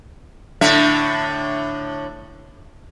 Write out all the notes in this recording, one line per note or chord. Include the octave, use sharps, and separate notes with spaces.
A2 D3 E5